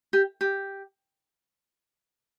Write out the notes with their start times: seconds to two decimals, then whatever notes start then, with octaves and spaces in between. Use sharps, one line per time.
0.13 G4
0.41 G4